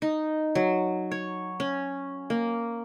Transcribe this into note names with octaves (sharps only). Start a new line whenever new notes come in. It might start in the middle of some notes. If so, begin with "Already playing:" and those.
D#4
F#3
C#5
C#4
A#3